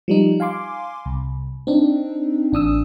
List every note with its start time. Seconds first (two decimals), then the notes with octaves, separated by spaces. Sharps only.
0.08 F3 G3 D#4
0.40 F5 G#5 C6 D6
1.05 C2
1.67 C4 D4 D#4
2.52 A1 D4 D#6 E6